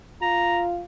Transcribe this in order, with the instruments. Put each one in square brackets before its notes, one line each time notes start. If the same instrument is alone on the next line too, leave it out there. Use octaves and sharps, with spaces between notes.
[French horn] F4 [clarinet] A#5